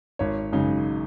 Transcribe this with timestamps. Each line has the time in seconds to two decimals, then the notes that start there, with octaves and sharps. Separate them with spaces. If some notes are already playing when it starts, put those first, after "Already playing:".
0.19 G#1 C#5
0.52 F#2 C#3 G#3 D#4